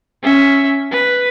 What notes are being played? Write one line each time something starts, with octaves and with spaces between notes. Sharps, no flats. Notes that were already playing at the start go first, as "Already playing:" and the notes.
C#4 E5
B4